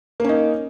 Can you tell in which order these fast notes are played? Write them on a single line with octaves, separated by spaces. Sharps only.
A#3 C#4 D#4